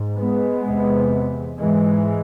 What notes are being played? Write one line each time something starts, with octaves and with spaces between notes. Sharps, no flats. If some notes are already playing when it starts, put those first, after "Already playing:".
Already playing: G#2
G#3 B3
E2 C3
G#2 E3 G#3